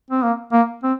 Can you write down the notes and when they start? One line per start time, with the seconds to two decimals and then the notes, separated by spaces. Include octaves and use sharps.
0.11 C4
0.23 A#3
0.52 A#3
0.83 C4